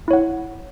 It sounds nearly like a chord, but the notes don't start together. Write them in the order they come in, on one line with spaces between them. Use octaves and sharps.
E4 C#5 F#5